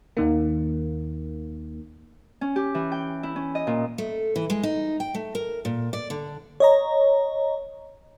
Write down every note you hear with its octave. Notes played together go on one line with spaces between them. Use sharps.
D#2 D#3 A#3
C#4
G4
E3
G5
E4
C#4
D#5
A#2
A3
E3
G#3
D#4
G5
A3
A#4
A#2
D5
D3
C#5 D#5 A#5